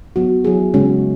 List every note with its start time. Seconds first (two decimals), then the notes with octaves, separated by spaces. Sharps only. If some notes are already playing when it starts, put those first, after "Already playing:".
0.16 F#3 B3 F#4
0.44 F#3 E4 G#4
0.74 C#3 G#3 C#4 F#4